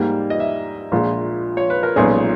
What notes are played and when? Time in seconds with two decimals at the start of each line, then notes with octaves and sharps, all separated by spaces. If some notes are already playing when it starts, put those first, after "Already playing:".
Already playing: G#2 G3 A#3
0.30 D#5
0.40 E5
0.92 A#1 A#2 G#3
1.57 C#5
1.70 B4
1.83 A#4
1.96 B1 A#2 G#3 C#4 G#4